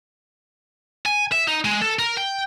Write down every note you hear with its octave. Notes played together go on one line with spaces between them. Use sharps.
G#5
E5
D#4
G#3
A4
A#4
G5